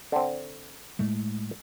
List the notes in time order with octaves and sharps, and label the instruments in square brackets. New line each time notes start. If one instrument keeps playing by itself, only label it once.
[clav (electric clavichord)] D3 C4
[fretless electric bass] A2 G#3 A3